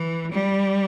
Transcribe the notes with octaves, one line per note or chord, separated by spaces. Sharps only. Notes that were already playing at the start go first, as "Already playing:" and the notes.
Already playing: E3
G3